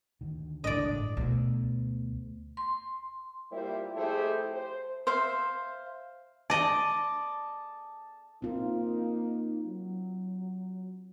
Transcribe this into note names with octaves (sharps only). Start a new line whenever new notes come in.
D2 D#3
D1 G1 C#2 A2 D4 D5 D#5
D2 B2
C6
G3 A#3 E4 F4 G4 C5
F2 A3 E4 G4 G#4 C5
C5
C5 E5 F5
D5 D#5 A5
A#3 C4 D#4 F4
F#3